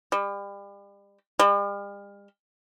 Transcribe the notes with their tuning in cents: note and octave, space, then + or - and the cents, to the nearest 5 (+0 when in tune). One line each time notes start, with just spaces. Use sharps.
G3 +35
G3 +45